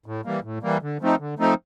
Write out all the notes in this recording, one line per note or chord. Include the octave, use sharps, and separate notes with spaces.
A2
E3 G3 A#3
A2
E3 G3 A#3
D3
F3 A3 C4 D#4
D3
F3 A3 C4 D#4